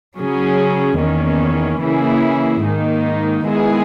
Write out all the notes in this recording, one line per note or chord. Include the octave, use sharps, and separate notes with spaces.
C#3 F#3 C#4 G#4
E2 D#3 A#3 C#4
C#3 E3 A#3 E4 G#4
G#2 D#3 A#3 D#4
D#3 G#3 B3 E4 G#4